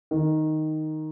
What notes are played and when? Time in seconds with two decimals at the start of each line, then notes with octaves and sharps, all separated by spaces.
0.11 D#3